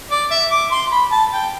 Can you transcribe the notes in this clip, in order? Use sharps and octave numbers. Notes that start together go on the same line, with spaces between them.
D5
E5
D6
C6
B5
A5
G5